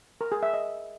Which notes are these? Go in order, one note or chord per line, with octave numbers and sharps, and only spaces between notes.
A#4
G#4
E5
D#5